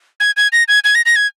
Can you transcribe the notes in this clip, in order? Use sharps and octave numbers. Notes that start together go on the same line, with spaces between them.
G#6
G#6
A#6
G#6
G#6
A#6
A#6
G#6